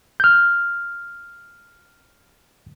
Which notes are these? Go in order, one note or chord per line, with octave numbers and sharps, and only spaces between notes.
F6 G6